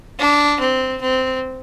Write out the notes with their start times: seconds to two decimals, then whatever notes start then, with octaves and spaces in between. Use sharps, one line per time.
0.19 D4
0.60 C4
1.01 C4